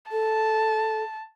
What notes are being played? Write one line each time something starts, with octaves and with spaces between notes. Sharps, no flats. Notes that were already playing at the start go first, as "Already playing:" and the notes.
A4 A5